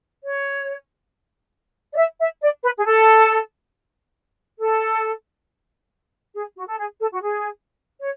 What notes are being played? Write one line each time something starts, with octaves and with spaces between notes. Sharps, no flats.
C#5
D5
E5
E5
D5
B4
G#4
A4
A4
G#4
F#4
A4
G#4
A4
F#4
G#4
C#5